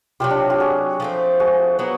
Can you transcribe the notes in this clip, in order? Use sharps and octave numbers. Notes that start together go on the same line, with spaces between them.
C3 D#3 F#3 F4 G4
D4
F4 G4
F#4 G#4
F3 A3 C4
F#4 G#4
F#3 B3 E4